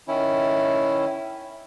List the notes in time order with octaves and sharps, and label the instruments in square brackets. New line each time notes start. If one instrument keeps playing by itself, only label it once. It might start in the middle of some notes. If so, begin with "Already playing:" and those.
[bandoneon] D#3 C#4 E4